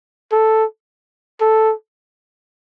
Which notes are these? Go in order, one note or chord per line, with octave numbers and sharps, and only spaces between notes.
A4
A4